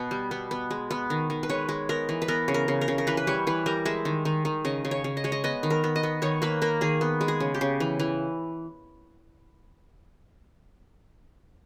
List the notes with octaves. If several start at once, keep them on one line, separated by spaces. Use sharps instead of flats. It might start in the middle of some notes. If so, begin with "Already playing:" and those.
Already playing: B2 B3
G3
B3
B3
G#3
B3
D#3
D#3
B4
G#3 C#5
G#3
B3 A#4
E3
B4
B3 A#4
C#3
A#4
C#3
A#4
C#3
A#4
E3 B4
B4
G3 C#5
E3 B4
G3 A#4
G#3 E5
D#3
D#3
D#3
C#3 D#5
C#3
C#5
C#3
D#5
G#3 C#5
D#5
B3 D#5
D#3
A#4
B3
D#5
B3
D#3 C#5
A#3 B4
A#3 A#4
D#3 G#4
B3
G#3
G#4
C#3
G4
C#3
E3
E3